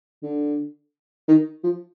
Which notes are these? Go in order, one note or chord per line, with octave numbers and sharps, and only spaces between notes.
D3
D#3
F3